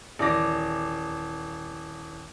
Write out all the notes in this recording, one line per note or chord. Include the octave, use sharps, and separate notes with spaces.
D#1 E3 D5 D6 A#6